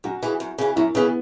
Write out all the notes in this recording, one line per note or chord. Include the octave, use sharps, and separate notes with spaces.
F#2 F#4
C#3 E3
F#2
C#3 E3
F#2 E4
C#3 E3 B3